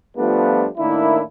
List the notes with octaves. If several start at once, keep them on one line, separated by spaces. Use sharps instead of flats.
F3 G3 A3 B3 D4 F4
A2 D#3 A#3 D4 E4